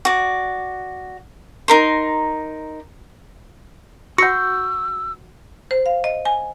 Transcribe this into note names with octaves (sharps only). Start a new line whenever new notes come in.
F#4 D5
D#4 A#4 C6
F#4 F#5 C#6 E6 G6 A#6 C#7
C5
F5
D#5
G#5